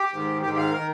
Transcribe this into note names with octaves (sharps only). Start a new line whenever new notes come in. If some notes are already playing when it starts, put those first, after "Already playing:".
Already playing: G4
G#2 D#3
G#2 D#3 G4
F5
D#3 A#4